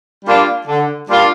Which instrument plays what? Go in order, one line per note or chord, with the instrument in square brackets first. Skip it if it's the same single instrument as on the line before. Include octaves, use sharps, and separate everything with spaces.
[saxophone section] G3 A#3 D4 F4
D3
G3 A#3 D4 F4